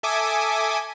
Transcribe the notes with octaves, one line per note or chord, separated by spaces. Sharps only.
A4 E5 G#5 D6 D#6